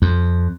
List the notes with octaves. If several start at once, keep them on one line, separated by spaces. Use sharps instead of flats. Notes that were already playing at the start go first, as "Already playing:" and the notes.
F2